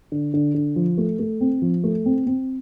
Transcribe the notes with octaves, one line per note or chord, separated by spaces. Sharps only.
D3
D3
D3
F3
A3
A3
C4
F3
A3
C4
C4